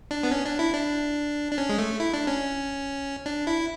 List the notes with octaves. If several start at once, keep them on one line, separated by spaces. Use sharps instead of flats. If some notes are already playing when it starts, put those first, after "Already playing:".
D4
B3
C#4
D4
E4
D4
D4
C#4
G#3
A3
E4
D4
C#4
D4
E4